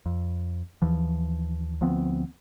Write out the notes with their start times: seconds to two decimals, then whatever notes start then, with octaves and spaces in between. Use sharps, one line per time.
0.06 F2
0.82 D#2 E3 F3
1.81 D2 F3 B3 C4